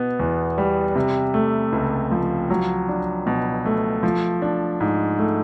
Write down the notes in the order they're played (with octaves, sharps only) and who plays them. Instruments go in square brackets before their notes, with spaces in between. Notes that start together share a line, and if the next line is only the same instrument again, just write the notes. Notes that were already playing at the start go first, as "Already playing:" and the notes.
Already playing: [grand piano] B2 B3
E2
G3
C3
A3
C#2
F3
F#3
D4
B2
A3
F3
D4
G#2
A3